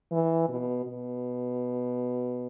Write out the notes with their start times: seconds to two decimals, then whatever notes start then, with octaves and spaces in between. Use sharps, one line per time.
0.12 E3
0.48 B2
0.84 B2